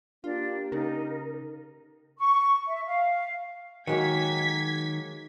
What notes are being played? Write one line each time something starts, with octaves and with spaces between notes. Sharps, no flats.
A#3 D4 F4 G4
C#3 D#4 A#4
C#6
E5
F5
D#3 F#3 G#3 A#3 G#6 B6